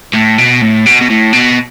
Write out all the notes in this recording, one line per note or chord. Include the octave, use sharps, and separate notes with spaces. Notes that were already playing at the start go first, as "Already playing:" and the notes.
A2
B2
A2
B2
B2
A2
B2